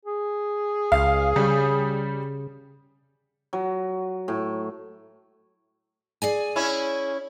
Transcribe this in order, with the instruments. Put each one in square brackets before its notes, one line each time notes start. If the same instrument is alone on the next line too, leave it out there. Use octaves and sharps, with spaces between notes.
[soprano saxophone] G#4
[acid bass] C#2 [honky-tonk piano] F5
[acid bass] C#3 [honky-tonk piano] G3
[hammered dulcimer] F#3
A2
[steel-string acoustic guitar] G#4 D5 G#5
[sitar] C#4 E4